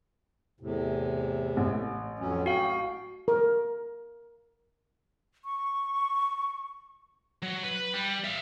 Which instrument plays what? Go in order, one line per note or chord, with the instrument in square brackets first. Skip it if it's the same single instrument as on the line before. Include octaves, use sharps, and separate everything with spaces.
[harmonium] E2 A2 C3
[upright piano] A1
[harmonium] F2 F#3 C#4
[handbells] F#4 F5 [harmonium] G5
[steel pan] A#4
[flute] C#6
[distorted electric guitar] F#3
B4
G3
E5 F5